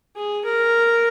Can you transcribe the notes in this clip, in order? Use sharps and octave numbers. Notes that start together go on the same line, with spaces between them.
G#4
A#4